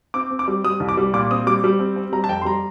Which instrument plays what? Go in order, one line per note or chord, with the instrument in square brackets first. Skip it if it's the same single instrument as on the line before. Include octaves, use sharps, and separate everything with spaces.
[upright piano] C4 D6
C4
D6
G3
G3 D#6
C2
D6
G3
A#2 D6
C4 D#6
G3 D6
G3
C4
C4
G3 A#5
A5
F2 G5
C6
G3 A#5